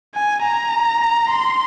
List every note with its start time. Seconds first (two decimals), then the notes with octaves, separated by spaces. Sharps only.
0.15 G#5
0.44 A#5
1.30 C6